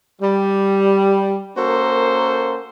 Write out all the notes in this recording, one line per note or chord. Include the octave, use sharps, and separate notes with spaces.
G3
A#3 C#4 F#4 A4 A#4 C5